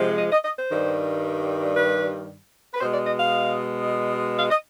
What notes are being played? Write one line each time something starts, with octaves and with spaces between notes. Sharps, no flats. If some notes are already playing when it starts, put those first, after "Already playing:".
Already playing: C3 F3 G#3
D#5
D#5
D#5
C5
G2 D#3 G3
B4
B4
B2 G#3 C5
D5
D#5
F5
F5
D#5